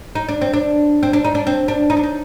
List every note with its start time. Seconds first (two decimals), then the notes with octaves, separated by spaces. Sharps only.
0.15 D#4
0.28 D4
0.41 C4
0.53 D4
1.03 C4
1.13 D4
1.25 D#4
1.35 D4
1.47 C4
1.68 D4
1.90 D#4
1.97 D4
2.03 D#4